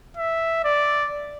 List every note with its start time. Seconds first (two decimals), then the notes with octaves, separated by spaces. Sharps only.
0.17 E5
0.65 D5